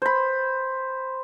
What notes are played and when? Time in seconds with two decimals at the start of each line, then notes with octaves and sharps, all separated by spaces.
0.02 C5 B5